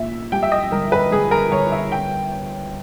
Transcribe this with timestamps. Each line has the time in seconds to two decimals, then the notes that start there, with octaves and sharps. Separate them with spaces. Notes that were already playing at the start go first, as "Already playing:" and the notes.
Already playing: A#1 A#2 E5
0.32 G3 G5
0.43 E5
0.52 D#5
0.72 G1 A#4
0.92 B4
1.11 G1 G#4
1.31 A#4
1.52 G1 C#5
1.72 E5
1.92 G5